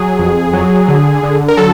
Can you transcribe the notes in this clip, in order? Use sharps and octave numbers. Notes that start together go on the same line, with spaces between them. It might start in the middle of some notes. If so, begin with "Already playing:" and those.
Already playing: F#3 G#4
F2
F#3
D3
D3
A#4
F#3 A4